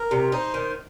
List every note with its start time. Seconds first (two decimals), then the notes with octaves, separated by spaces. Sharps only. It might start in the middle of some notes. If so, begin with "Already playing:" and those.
Already playing: A#4
0.11 C3
0.32 D#4 C5
0.54 D#3